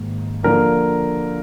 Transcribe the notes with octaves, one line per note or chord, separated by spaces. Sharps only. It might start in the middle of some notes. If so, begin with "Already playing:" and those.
Already playing: G#2 D#3 A#3
D3 F3 A#3 A#4